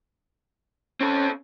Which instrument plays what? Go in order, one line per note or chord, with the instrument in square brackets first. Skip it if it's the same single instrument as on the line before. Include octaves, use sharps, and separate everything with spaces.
[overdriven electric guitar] C4 A4 [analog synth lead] C#4